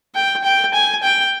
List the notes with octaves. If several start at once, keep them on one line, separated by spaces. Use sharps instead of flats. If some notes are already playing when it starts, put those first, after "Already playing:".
G5
G5
G#5
G5